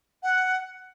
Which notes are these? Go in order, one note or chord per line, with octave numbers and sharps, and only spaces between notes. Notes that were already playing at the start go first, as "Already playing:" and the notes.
F#5